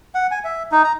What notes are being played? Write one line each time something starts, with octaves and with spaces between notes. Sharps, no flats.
F#5
G#5
E5
D#4
A#5